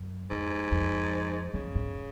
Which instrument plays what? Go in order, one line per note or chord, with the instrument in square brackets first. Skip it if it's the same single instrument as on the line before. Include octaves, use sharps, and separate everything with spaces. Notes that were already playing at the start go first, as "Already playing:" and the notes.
Already playing: [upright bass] F#2
[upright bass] F2 [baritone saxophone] G#2
[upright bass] F2
[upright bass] F2 [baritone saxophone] C#3
[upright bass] G#2